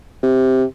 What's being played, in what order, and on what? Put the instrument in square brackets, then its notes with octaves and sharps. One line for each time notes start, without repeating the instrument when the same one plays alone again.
[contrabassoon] C3